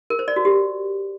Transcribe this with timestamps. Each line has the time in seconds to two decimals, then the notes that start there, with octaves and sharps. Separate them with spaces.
0.10 A#4
0.19 C5
0.28 D5
0.36 F#4
0.45 G4